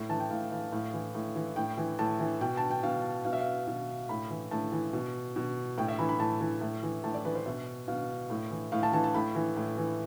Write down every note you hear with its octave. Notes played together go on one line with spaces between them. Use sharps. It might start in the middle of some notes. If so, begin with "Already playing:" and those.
Already playing: A2
E3 A5
G5
A2 F5
E3 F5
A2 F5
E3
A2
E3
A2 G5
E3
A2 A5
E3
B2 G5
A5
G5
B2 F5
B2 F5
E5
F5
B2
A2 B5
E3
A2 A5
E3
B2
B2
A2 G5
E5
E3 B5
B5
A2 A5
E3
A2
E3
A2 A5
D5
E3 B4
C5
B2 E5
B2 F5
A2
E3
A2 F5
A5
E3 A5
A5
A2 B5
E3
A2
E3